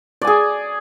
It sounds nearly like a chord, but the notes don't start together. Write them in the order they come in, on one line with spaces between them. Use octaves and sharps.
D5 G#5 G#4